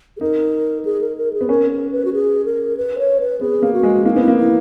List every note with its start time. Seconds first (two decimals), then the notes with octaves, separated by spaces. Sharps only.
0.17 G#4
0.21 D#4 A#4
0.85 G#4
1.01 A#4
1.17 A#4
1.33 G#4
1.41 B3
1.49 C#4 A#4
1.71 A#4
1.92 B4
2.05 F#4
2.13 G#4
2.45 A#4
2.77 B4
2.98 C#5
3.20 B4
3.41 B3 G#4
3.62 A#3
3.73 F#4
3.83 G#3
4.04 A#3 E4
4.13 D#4
4.16 B3 E4
4.28 A#3
4.37 E4